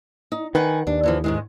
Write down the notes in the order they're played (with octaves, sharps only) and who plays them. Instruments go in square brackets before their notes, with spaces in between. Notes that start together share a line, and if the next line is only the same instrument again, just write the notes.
[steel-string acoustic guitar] D#4
[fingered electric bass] D#3 [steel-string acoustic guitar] B4 F#5 G#5
[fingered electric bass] D#2 [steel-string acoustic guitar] D4
[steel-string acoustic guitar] D3 E3 F3
G#2 D#3 G#3